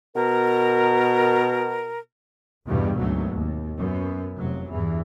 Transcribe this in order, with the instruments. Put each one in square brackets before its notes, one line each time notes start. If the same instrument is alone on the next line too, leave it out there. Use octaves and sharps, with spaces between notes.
[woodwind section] B2 A#4
[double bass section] G1 E2 G2 B2 G3
G#1 D2 B2 F#3 A3
D#2
F#2 B3
F1 F#3
E2 G2 E3